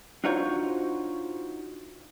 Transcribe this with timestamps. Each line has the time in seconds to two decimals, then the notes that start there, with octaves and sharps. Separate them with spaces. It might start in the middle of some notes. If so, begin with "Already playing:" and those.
0.24 D4 D#4 F4 F#4 C5 C#5